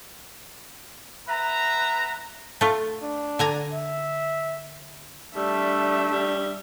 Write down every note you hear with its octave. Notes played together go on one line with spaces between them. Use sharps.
B4 E5 F#5 A#5
A3 F4
D4
D3 G#5 A#5
E5
G3 A3 D4 E5
G3